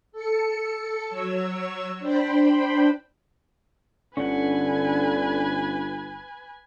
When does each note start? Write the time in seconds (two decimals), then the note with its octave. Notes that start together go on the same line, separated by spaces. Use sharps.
0.12 A4 C#7
1.08 F#3 C#5 E6
1.99 D4 C5 G5 B5
4.17 G1 D3 C#4 B4 F#5 G#5